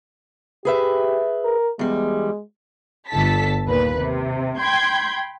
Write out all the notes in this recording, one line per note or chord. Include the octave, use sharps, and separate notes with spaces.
G4 G#4 B4 E5
A#4
E2 G3 G#3
G1 A4 A5 B6
D#2 A#2 B4
C3
G5 B5 C6 G6 G#6